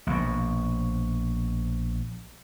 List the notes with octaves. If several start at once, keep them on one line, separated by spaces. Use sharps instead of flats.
A#1 B2